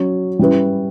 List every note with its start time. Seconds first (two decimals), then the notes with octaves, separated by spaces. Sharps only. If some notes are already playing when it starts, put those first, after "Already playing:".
Already playing: F#3 C#4 F#4 C#5
0.39 G3 C#4 E4 B4